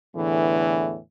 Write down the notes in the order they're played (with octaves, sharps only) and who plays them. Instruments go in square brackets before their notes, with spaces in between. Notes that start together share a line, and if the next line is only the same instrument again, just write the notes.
[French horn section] E2 A2 D3 E3